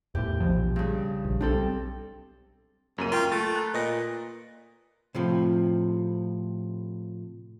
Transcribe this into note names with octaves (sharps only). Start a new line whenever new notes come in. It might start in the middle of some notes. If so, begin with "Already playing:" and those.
E2 A2 G4
A#1 B2 F3
G2 C#3
A#1
B1 G3 C4 D4 A4
C#2 F#2 A#3 D#7
F4 A#4 G5 C#6
A3 A6
A#5 F#6
A#2 B4 D#5 A#6
A2 C3 F3